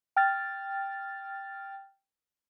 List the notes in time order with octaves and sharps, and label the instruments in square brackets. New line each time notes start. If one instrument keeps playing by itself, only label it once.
[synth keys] G5 F6 A6